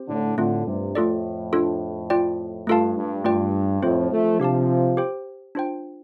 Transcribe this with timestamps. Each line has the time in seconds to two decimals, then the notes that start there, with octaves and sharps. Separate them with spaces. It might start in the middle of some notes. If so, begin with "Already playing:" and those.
Already playing: C4 G4 C5
0.09 A2 D3
0.37 A2 D3 A3 C4 F4
0.66 G2 C3
0.95 F2 A2 A3 F4 A4 D5
1.53 D4 F4 A4
2.10 F4 D5 G5
2.67 G2 A3 F4 A4 F5 A5
2.97 G2
3.25 G2 A3 F4 D5 G5
3.82 F2 A2 C4 F4 C5
4.11 F3 A3
4.40 C3 F3 D4 G4 F5 A5
4.97 G4 C5 G5
5.55 D4 F4 C5 G5